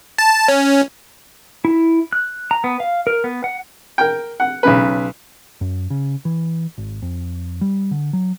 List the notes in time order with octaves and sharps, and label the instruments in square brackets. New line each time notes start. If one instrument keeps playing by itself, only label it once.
[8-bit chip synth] A5
C#4
[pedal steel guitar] E4
F#6
A#5
B3
F5
A#4
B3
F#5
[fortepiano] A#4 G5
F#5
B1 C#3 B4
[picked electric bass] F#2
C#3
E3
G#1
F2
G3
D3
F#3